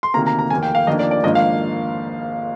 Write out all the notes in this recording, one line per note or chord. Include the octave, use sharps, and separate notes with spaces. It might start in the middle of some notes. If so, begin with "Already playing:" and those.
C6
D2 C3 D#3 A#3 A#5
A#5
A#5
F1 D#2 D#3 A#3 G#5
G5
F5
F1 F2 D#3 A#3 D4 D#5
D5
D5
G#1 G#2 F3 A#3 D4 D#5
F5